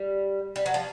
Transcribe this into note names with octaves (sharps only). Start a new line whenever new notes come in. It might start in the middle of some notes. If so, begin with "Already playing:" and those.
Already playing: G3
G3
F#3
F3